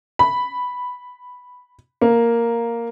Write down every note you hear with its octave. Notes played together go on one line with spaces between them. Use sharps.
B5
A#3